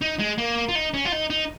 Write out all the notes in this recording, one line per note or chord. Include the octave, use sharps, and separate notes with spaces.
D#4
G#3
A#3
F4
D#4
C#4
F4
D#4
D#4